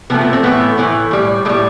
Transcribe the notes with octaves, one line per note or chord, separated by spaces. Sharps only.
C3 F3 A3 B3
B3
C4
A2 E3 A3 B3
A2 E3 A3
A2 G3
A2 G3 A3